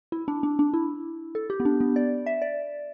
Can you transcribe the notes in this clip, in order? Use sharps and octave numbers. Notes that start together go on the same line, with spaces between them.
E4
D4
D4
D4
E4
A4
G4
B3
D4
B3
D5
E5
D5